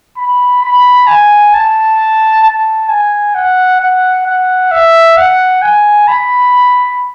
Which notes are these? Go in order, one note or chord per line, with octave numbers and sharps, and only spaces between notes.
B5
B5
G#5
A5
A5
G#5
F#5
F#5
F#5
E5
F#5
G#5
B5